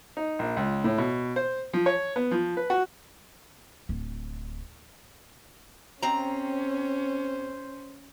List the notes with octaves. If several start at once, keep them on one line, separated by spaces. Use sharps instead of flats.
D#4
A#1
C#2
A2
B2
C5
F3
C#5
B3
F3
B4
F#4
D1
D#2 C4 C#4 C5 A#5